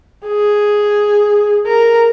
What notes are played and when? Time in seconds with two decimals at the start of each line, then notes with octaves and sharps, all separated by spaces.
0.26 G#4
1.67 A#4